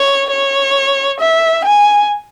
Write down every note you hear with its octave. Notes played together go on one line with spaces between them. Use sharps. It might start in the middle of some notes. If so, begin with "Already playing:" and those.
Already playing: C#5
C#5
E5
G#5